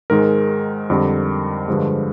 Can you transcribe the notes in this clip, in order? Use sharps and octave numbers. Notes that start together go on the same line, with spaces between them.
G#2 D#3 G#3 A#4
F2 D3 G3
G2 D3 F3 G#3